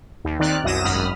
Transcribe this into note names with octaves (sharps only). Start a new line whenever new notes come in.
D#2
D#3 C4 D5 F6 F#6
C2 F#2 F#3 D#6 A#6 E7
G#1 F#2 B5 D#6 F6